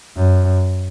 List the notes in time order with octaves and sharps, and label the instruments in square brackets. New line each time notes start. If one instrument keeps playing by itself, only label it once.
[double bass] F#2